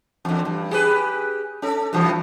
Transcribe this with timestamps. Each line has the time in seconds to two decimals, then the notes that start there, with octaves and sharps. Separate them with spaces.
0.25 E2 D3
0.45 G2
0.71 G4 G#4 B4
1.62 C#4 A4
1.93 G2 C3 E3